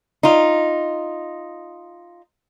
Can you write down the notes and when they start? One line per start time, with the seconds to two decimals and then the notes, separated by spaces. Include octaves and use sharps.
0.23 D#4 F4